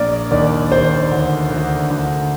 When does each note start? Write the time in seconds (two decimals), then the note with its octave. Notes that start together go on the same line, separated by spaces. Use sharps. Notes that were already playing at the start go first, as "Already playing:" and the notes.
Already playing: A#1 A#3 A#4 D5
0.31 D#2 D5
0.72 D#2 C5
1.11 D2
1.50 D2
1.91 D2